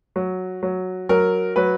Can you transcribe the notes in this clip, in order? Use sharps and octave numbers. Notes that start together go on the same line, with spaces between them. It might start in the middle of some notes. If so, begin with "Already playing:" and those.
F#3
F#3
F#3 A#4
F#3 B4